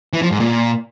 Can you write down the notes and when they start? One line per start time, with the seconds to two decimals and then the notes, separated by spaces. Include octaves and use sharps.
0.13 E3
0.22 F3
0.31 G#2
0.40 A#2